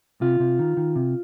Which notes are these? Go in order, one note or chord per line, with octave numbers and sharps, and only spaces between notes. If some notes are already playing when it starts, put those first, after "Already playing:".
C3 F4
C3
D#3
D#3
C3